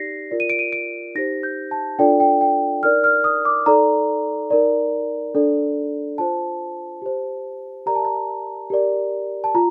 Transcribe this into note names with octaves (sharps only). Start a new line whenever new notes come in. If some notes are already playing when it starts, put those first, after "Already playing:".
Already playing: D#4 G4 D5 A#6 C7
F4 A#4 D5
D#7
D7
D#7
D7
D#4 G4 C5 A#6
G6
A5
D4 F4 A4 D5 G5
G5
G5
D#4 A#4 D5 F6
F6
D#6
D6
D#4 A4 D5 A#5
D#4 A#4 D5
D4 A4 D5
F4 C5 A5
G4 C5
G4 A#4 D5 A#5
A5
A#5
G4 A#4 D5
A5
F4 A#5